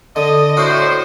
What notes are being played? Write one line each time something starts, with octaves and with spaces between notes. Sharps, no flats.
D3 D#5
A2 F#4 C5